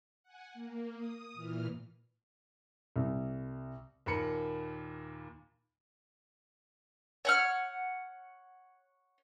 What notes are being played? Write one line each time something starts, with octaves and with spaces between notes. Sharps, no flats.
F#5 G#5
A#3
D#6
A#2 E3 F6
C2
D#2 A#2 A#4 B5 C#7
C#5 F#5 F6